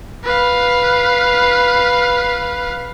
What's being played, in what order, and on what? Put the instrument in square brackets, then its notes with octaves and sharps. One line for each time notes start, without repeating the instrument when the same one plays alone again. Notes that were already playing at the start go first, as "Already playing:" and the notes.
[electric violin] B4 F5